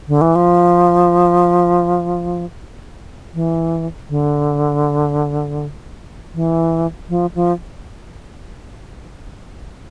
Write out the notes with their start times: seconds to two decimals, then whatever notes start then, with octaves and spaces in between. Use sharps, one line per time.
0.08 D3
0.21 E3
0.35 F3
3.34 E3
4.09 D3
6.34 E3
7.09 F3
7.35 F3